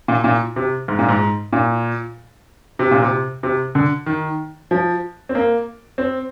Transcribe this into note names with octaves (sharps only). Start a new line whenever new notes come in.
A#2
A#2
C3
G#2
A#2
G#2
A#2
C3
A#2
C3
C3
D3
D#3
F3
C4
A#3
C4